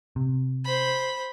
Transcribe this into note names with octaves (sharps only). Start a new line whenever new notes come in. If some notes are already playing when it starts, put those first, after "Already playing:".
C3
C5 B5